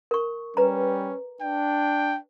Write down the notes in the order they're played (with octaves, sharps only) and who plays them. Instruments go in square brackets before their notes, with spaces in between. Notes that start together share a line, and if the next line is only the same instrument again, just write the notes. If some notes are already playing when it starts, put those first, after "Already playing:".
[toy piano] A#4 C#6
[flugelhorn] G3 [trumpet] C#4 [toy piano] B4 A#5
[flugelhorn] D4 [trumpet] G5